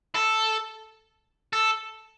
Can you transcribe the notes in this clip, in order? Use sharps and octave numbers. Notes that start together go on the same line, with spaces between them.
A4
A4